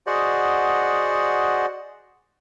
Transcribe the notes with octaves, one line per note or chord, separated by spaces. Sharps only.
F#4 G#4 C5 D5 D#5 F#5